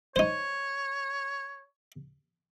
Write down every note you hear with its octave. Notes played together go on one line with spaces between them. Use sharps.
D#4 C5 C#5